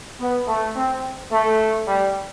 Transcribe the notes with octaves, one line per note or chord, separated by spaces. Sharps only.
B3
A3
C4
A3
G3